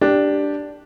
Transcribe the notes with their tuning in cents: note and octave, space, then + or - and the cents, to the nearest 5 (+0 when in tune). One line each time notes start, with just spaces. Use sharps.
D4 +0 G4 +0